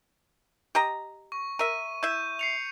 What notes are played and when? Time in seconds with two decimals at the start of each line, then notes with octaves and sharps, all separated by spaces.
0.75 G4 D#5 A#5
1.32 C#6
1.59 A#4 E5 D#7
2.03 E4 E5 G6
2.39 C7 C#7 F7